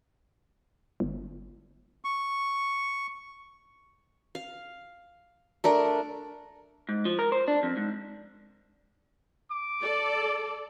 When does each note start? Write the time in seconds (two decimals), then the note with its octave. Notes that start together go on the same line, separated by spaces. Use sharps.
1.00 G1
2.05 C#6
4.35 F5
5.64 A3 D4 A#4
6.89 G#2
7.05 F3
7.19 A#4
7.32 C5
7.48 D4
7.63 F2
7.77 G#2
9.52 D6
9.81 A4 D5